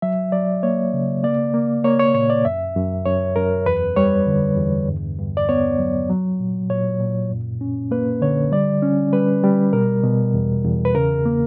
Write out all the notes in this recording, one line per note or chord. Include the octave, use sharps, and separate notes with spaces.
F#3 E5
F#3 D5
A#3 C#5
C#3
A#3 D5
A#3
A#3 C#5
C#5
A#2 C#5
D5
F#2 E5
F#2
F#2 C#5
F#2 A#4
E2 B4
G3 C#5
D3
E2
G2
G2
D5
B3 C#5
F#3
F#3
A#2
A#2 C#5
A#2
F#2
C#4
A#3 B4
D3 C#5
G3 D5
C#4
G3 B4
G3
B2 A#4
B2
E2
E2
B4
C#3 A#4
A#3